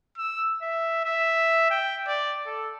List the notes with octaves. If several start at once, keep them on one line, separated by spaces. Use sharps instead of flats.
E6
E5
E5
G5
D5
A4